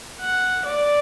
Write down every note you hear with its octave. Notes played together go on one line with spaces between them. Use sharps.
F#5
D5